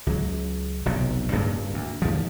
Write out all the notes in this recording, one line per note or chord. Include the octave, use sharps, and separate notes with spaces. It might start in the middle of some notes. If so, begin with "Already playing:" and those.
C#2 F#3
F1 B1 C3
D1 G2 C#3 A#3
D2
D#2 F3